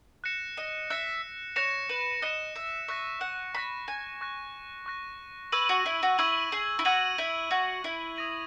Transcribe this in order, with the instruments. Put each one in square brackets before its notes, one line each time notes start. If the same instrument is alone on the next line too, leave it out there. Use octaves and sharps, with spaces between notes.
[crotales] F#6 A#6 C#7 E7
[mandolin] D#5
[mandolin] E5 [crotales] F#6 A#6 C#7 E7
[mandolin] C#5 [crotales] F#6 A#6 C#7 E7
[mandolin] B4
[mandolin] D#5 [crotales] F#6 A#6 C#7 E7
[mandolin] E5
[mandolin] E5 [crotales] C#6 F#6 A#6
[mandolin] F#5
[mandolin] B5 [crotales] C#6 F#6 A#6
[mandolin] G#5
[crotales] C#6 F#6 A#6
C#6 F#6 A#6
[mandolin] B4 [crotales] C#6 E6 G#6 D#7 F#7
[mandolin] F#4
E4
F#4
[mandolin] E4 [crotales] C#6 E6 G#6 D#7 F#7
[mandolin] G#4
E4
[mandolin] F#4 [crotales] C#6 E6 G#6 D#7 F#7
[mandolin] E4
[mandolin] F#4 [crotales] C#6 E6 G#6 D#7 F#7
[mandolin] E4
[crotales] D#6 A#6 D#7 F#7